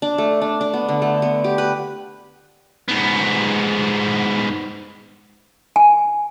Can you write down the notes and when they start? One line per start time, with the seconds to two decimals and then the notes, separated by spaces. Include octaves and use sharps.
0.02 D4
0.18 A3
0.41 D4
0.61 D4
0.74 B3
0.89 D3
1.02 A3
1.22 B3
1.44 G4
1.58 B4
2.88 G#2 B3
5.76 G#5